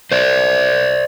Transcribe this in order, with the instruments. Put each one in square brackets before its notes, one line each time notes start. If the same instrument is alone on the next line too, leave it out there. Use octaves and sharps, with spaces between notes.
[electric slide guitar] C5 D5